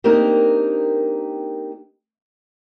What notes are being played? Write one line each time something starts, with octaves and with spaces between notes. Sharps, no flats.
A#3 C4 D4 D#4 G4 A#4